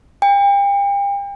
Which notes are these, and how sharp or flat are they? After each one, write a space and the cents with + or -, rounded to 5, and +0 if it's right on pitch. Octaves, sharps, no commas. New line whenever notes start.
G5 +35